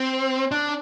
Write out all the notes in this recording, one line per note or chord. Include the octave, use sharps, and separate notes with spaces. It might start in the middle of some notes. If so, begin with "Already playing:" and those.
Already playing: C4
D4